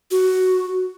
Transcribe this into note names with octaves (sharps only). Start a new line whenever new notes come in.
F#4